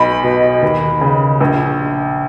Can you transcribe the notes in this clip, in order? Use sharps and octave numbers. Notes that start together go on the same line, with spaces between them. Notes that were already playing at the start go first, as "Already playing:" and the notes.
Already playing: B1 B5
B2
D#2
C#3
A#1